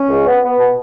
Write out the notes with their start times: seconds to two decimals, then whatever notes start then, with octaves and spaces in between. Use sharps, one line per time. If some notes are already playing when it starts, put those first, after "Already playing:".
Already playing: C#4
0.09 C#2
0.26 B3
0.43 B3
0.58 B2